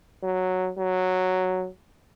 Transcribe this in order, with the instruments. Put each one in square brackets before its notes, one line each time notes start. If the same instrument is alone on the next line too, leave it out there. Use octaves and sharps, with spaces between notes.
[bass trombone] F#3
F#3